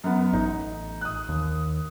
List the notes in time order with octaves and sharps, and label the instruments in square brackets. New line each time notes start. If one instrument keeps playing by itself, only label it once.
[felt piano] F#2 B3
[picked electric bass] A1 [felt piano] D#4
[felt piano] D#6 F#6
[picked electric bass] D#2